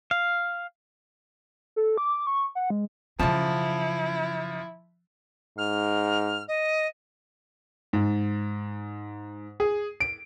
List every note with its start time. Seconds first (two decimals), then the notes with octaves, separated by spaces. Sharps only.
0.11 F5
1.76 A4
1.98 D6
2.27 C#6
2.55 F#5
2.70 G#3
3.19 F#2 C#3 F3 C#4 E4 A5
5.58 G#2 F6
6.48 D#5
7.93 G#2
9.60 G#4
10.00 D7